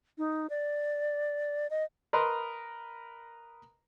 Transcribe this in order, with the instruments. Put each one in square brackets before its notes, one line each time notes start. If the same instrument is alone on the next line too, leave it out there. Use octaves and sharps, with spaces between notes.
[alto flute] D#4
D5
D#5
[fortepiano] A#4 B4 D#5 A#5 C6